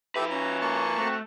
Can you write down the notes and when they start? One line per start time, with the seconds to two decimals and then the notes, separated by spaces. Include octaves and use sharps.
0.16 F3 G4 A4 B4 E5
0.31 C#4 F#4 A#5
0.62 A#3 A5 C#6
0.98 A3 C4 F#4